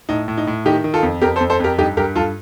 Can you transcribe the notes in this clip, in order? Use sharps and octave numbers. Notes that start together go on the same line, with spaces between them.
A2 D#4
A2
D#4
A2
D#3 D#4 G4
D#3
F4 A4
F2
F2 G4 A#4
A4 C5
F2
A4 C5
F2 G4 A#4
G2 D#4 G4
G2 G4 A#4
G2 F4 A4